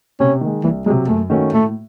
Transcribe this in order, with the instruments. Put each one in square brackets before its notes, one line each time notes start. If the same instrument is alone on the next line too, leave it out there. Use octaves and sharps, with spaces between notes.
[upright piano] C3 [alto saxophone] C#4
[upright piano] D#3 G#3
[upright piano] C2 [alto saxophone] E3
[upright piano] C3 F#3 [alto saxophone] G#3
[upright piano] F#2 [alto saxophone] A3
[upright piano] D#3 A3 C#4 F#4
[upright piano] A2 [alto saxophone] A3